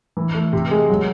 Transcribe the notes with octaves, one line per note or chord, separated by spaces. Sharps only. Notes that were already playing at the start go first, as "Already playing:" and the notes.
E3
A3
C3
G#3
F#3